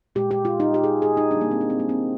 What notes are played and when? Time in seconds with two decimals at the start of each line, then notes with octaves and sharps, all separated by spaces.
0.15 A#2 G#3 G4
0.31 G4
0.45 F4
0.60 D#4
0.74 G4
0.84 G#4
1.02 G#4
1.17 D#4
1.31 D3 G3 A#3 D4
1.41 A#3
1.51 C4
1.61 D4
1.70 C4
1.79 A#3
1.89 C4